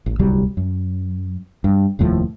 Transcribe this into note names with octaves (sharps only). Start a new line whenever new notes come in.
A1
D1 C2 F#3 G3
F#2
G2
F1 D#2 A2 F3